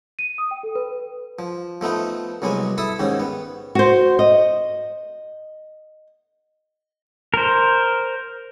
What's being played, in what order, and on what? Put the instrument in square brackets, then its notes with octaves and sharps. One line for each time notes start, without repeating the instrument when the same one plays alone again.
[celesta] D#7
D#6
G5
A4
B4
[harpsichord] F3
F3 A3 B3 D#4
C2 F#3 G#3 B3 G#5
E4 A4 A5 D#6
D#2 G#2 D#3 C#4
B3
[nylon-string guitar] F#4 C5
D#5
[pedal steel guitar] A#4 C5